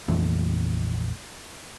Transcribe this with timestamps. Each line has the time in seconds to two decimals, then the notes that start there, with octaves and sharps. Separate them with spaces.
0.08 A#1 F2 E3 A3